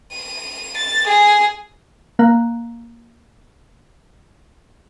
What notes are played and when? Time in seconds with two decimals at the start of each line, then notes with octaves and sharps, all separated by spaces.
0.15 D#7
0.78 A6
1.08 G#4
2.19 A#3 F5 A#5 F#6